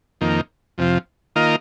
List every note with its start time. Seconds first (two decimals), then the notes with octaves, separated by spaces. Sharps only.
0.21 F2 D#3 A#3
0.78 F2 C3 F3
1.36 D#3 A#3 F4 A#4 D#5